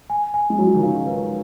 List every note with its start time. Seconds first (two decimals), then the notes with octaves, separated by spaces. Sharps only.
0.10 G#5
0.34 G#5
0.50 G#3
0.58 F#3 F#4
0.66 F3
0.74 D#3
0.83 C#3 F5
1.07 B4